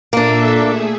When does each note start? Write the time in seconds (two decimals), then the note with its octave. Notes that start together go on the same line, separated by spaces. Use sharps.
0.13 A#2 A#3 D4 A4 E5
0.63 A3 G#4